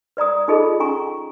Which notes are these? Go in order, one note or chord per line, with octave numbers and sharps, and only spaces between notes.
B4 D5 A#5 D#6
D#4 F4 G#4 A4 D#5 B5
C#4 G#5 A#5 C#6